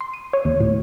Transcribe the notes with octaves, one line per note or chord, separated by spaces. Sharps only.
C6
D#7
C#5
D#2
A2